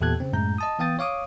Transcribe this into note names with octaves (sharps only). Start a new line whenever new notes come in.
E2 A#2 G4 A4 F#6 G#6
C#3 C4
F#2 A2 G#3 A#5 G6
D#5 A5 D#6
E3 B3 F5 G5 D#6 A6
C#5 F5 D6 D#6